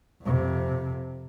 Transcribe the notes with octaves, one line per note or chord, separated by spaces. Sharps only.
F2 C3